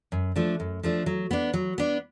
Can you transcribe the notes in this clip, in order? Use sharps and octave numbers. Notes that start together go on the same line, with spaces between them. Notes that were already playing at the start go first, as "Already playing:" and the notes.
F#2
F3 A3 D4
F#2
F3 A3 D4
F#3
B3 D4
F#3
B3 D4